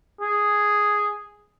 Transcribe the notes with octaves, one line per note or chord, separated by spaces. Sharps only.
G#4